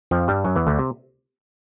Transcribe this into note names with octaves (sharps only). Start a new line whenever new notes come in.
F2 F3
G2 G3
F#2 F#3
E2 E3
D2 D3
C3